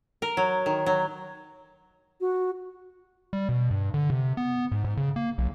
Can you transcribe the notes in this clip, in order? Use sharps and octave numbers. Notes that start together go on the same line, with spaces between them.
A#4
F#3
D#3
F#3
F#4
G3
B2
G2
D3
C3
B3
G#2
G#2
C#3
A#3
B1